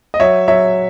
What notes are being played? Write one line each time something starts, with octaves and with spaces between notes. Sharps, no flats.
D#5
F#3 C#5 E5
F#3 C#5 E5